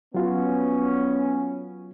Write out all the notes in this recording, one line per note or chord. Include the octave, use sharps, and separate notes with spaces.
F#3 B3 C#4 F4 F#4